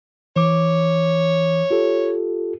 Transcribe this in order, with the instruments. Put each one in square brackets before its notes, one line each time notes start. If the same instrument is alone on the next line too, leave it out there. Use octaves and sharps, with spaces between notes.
[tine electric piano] E3 D6 [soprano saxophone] C#5
[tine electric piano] F4 G4 A4